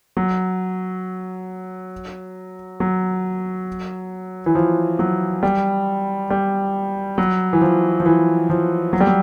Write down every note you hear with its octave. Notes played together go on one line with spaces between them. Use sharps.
F#3
F#3
E3
F3
F#3
G3
G3
F#3
E3
F3
F3
E3
F3
F#3
G3
F#3